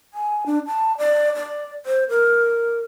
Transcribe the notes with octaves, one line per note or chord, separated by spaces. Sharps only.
G#5
D4
A5
D5
D5
C5
A#4